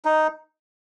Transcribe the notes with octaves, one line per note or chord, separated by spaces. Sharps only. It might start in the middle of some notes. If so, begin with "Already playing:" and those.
D#4